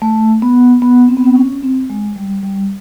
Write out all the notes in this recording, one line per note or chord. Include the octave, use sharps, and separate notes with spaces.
A3
B3
B3
C4
B3
C4
C#4
C4
G#3
G3
G3